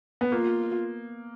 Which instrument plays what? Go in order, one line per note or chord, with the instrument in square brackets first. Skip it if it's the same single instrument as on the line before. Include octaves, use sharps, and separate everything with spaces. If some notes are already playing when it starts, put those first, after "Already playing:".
[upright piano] B3
[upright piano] A#3 [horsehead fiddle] F4